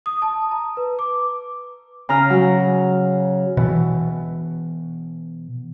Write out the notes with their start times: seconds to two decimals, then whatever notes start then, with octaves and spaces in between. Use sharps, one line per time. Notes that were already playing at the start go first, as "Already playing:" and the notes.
0.06 D#6
0.22 A5
0.51 A#5
0.77 B4
0.99 D6
2.09 C#3 A#5 F6
2.30 F#3
3.57 B2 E3